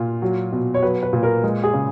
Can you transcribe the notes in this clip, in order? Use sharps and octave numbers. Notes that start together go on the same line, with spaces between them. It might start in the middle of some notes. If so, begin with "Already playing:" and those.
Already playing: A#2 F4
F#3
B2
C#5
F#3 B4
B4
A#2
A#4
G#3
G#4
C#3